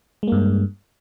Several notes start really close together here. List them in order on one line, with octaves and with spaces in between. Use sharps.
G#3 A#3 G2